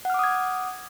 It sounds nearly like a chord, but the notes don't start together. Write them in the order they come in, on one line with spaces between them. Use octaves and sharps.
F#5 F6 D6 D#6 G#6